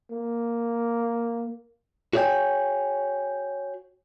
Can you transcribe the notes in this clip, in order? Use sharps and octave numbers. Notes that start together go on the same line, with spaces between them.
A#3
F#4 G#4 C#5 D5 G5 G#5